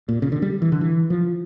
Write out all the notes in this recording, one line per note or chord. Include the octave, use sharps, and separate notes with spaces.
A#2
C#3
D3
G3
E3
D3
E3
F3